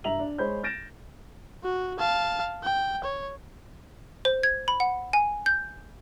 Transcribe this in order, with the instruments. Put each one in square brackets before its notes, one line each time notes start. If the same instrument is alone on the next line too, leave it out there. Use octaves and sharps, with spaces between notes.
[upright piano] G2 E5 A#5 F7 F#7
D4
G#3 C5 C#5 B5 G6
G6 A6 A#6 D7 E7
[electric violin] F#4
F5 A5
G5
C#5
[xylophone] C5
G#6
B5
F#5
G#5
G6